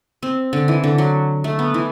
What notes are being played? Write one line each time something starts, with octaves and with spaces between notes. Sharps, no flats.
C4
D3
E3
D3
F#3
A3
B3
E3